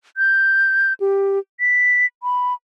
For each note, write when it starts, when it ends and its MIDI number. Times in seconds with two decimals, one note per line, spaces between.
0.17 0.93 91
1.00 1.39 67
1.60 2.06 95
2.23 2.54 83